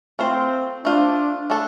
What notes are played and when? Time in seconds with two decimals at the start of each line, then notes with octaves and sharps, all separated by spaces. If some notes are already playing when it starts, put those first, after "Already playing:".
0.19 A3 C4 F4 C5
0.85 A3 D4 F4 C5
1.50 A3 D4 A4